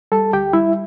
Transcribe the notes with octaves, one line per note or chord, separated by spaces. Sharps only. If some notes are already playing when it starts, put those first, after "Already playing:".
G3 A4 A5
D2 G4 G5
G3 E4 E5